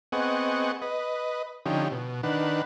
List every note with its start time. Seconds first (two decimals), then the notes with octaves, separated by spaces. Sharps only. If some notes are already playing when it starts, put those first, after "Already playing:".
0.12 B3 C4 G#4 D#5 F#5 C#6
0.82 B4 D#5
1.66 D3 F3 C#4 D#4 G4
1.92 B2
2.23 D#3 D4 B4 F#5